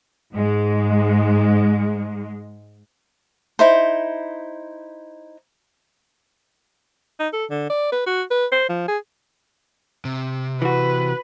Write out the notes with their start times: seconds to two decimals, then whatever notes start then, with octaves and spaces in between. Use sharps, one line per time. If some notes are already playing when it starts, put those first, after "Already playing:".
0.32 G#2 G#3
3.59 D#4 E4 C5
7.20 D#4
7.33 A4
7.50 D3
7.70 D5
7.92 B4
8.06 F#4
8.30 B4
8.52 C5
8.69 F3
8.88 G#4
10.05 C3
10.62 E3 F#4 B4